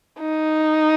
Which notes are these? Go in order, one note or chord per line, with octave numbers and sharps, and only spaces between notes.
D#4